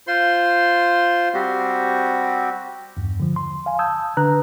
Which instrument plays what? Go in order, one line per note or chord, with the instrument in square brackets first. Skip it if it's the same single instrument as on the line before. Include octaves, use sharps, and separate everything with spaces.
[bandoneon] F4 C5 C6
G3 C4 F#4 G4
[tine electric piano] E2 G2
D3 F3
C6
F5 G#5
A5 D#6 E6 G6 G#6
D3 D4 B4 A#5 F#6